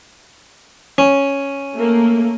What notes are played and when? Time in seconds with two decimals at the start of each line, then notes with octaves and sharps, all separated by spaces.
0.98 C#4
1.74 A3 A#3